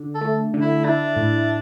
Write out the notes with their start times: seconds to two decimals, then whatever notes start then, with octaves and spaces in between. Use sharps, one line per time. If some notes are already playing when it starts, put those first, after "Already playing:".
Already playing: D3
0.15 A4
0.21 A3
0.54 D3
0.61 E4
0.85 D4 E4
1.17 A2